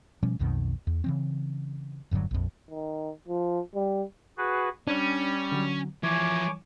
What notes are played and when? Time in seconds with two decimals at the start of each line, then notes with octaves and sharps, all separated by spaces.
0.23 B2 F3 G3 C#4
0.39 B1 F2 B2 D#3
0.87 E2
1.04 C#3 E3 C4
2.11 E1 G2 D3 F#3
2.31 A#1 F2
2.70 D#3
3.28 F3
3.75 G3
4.38 F#4 G#4 B4
4.87 G3 C#4 D4 C#5
5.52 D3 F#3
6.03 E3 F3 E4 C#5 G#5 D6